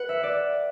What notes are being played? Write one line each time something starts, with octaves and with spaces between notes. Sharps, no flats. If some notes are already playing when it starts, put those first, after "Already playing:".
Already playing: B4 F#5
E5
D5